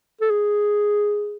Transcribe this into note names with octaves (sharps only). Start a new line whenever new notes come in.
A4
G#4